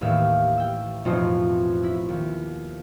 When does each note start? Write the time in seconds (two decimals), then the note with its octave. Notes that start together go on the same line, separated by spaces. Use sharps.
0.01 A1 D#2 A2 E5 F5
0.58 G5 E6
1.05 A1 F2 B2 D#4 F4 C5
1.83 E4 B6
2.09 D#2